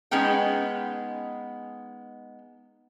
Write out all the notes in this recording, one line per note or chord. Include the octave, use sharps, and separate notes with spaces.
G#3 B3 C#4 D#4 G5